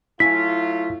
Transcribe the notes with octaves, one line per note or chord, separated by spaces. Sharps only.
F#3 A3 E4 F4 G#5 B6